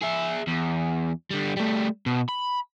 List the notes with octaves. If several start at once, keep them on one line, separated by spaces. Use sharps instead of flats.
G#4 E5
E2
D3 G3
G3 A3
B2
B5